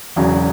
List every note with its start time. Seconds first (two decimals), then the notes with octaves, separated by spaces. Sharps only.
0.16 E1 E2 C#3 F#3